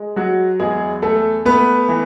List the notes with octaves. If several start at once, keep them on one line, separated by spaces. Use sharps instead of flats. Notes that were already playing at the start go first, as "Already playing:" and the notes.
Already playing: G#3
F#3 F#4
E2 G#3 G#4
A3 A4
A3 B3 B4
E3